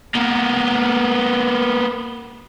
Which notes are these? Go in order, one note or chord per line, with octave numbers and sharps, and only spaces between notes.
A#3 B3